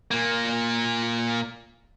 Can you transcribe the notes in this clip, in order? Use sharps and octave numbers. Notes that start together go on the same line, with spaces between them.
A#2 A#3